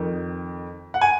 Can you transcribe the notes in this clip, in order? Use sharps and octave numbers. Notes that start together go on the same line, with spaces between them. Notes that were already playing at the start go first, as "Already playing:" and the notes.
Already playing: F2 D#3
F#5
G#5